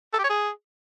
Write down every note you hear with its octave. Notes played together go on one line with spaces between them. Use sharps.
A4
G4
C#5
G#4